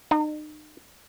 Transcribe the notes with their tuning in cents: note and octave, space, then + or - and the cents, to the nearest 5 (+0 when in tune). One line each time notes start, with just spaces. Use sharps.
D#4 -35